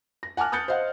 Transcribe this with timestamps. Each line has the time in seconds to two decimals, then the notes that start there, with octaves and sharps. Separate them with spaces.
0.23 A#6
0.37 F#5 G#5 A5 D6 F6 F#6
0.52 D#6 F#6 G6 A6 C#7
0.68 C5 D#5 F5 F#5